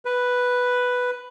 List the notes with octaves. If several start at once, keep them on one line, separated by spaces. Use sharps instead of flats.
B4